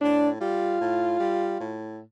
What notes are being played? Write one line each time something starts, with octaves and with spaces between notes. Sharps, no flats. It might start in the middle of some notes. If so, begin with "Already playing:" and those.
A2 D4
G3 F4
A2
G3
A2